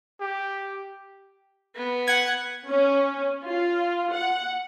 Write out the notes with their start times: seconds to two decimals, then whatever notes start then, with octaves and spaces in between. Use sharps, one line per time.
0.21 G4
1.76 B3
2.08 F#5 G#6
2.68 C#4
3.44 F4
4.13 F#5